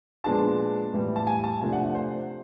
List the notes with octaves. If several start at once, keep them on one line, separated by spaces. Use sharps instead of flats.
A#2 F3 G#3 B3 D4 A5
A2 E3 G3
A5
G#5
A5
C3 F3 A3 D4 G#5
F#5
F#5
C5